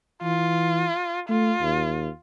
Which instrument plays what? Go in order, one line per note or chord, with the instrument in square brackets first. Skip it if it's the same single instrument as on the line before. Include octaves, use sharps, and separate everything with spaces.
[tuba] E3 [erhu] F4
[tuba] A3 [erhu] F4
[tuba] D#2